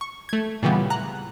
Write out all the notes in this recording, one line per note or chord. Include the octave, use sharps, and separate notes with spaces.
C#6
A3 G#6
A#2 C#3 E3 G3 B3
A#5 F#6